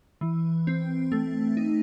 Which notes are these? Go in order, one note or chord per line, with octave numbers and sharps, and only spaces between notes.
E3
C4
A3
D#4